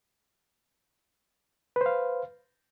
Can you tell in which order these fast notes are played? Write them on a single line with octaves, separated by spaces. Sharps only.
B4 C5 F5